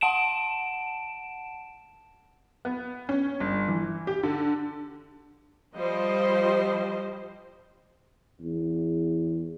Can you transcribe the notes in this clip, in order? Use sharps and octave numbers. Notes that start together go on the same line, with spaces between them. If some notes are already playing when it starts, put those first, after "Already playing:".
F#5 A5 D7 E7
B3
C#4
G1
E3
G4
D3
F3 G3 C5 D#5
E2